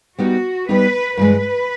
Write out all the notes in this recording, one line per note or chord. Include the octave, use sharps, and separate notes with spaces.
G3 B3 D#4 F#4 G4
G3 B3 D#4 G4 B4
G2 E3 G#3 B4